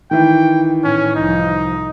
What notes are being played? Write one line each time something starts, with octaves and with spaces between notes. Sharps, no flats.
D#3 E3 G5
A2 C#4
C2 F3 D#4